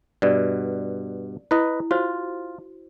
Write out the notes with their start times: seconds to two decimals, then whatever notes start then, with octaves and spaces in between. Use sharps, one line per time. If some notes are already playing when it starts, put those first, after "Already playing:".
0.22 G2 B2 D5
1.51 E4 B4 D#5
1.91 F4 F#4 C5